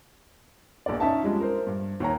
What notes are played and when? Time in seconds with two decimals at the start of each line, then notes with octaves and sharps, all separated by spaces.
0.86 A#1 A#2 B3 D5
1.00 C#4 D#4 E5 A5
1.23 F3 G3 G#3 D4
1.40 A#4 C5
1.66 G2
2.00 D#2 C#5 A#5